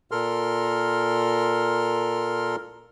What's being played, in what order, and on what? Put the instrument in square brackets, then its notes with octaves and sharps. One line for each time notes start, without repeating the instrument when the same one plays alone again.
[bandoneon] A#2 A4 A#4 C6 F6